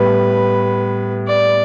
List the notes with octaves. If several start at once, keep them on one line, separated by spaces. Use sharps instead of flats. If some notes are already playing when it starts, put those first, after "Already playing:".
Already playing: A2 G3 B3 B4
D5